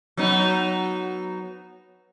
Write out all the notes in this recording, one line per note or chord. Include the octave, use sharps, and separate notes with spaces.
F#3 B3 D#4